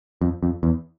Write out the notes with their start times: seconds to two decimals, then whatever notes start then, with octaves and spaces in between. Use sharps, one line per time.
0.21 F2
0.43 F2
0.63 E2